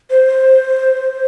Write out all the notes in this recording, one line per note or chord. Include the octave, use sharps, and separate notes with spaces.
C5